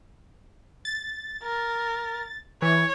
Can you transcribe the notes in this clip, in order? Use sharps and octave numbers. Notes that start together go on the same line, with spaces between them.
A6
A#4
E3 C#5